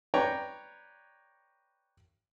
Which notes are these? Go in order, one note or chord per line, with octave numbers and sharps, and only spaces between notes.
B4 C#5 D5 G5 A#5 C#6